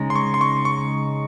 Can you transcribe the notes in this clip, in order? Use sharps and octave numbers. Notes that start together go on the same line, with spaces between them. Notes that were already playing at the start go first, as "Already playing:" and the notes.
Already playing: C#3 G#3 D#4
C6
C#6
C6
C#6
C#6